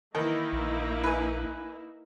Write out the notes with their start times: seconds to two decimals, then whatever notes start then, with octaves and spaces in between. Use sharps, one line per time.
0.15 D#3 E3 A#3 D#4 E4
0.53 A#1
1.04 B4 G#5